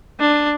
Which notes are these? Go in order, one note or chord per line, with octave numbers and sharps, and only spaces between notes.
D4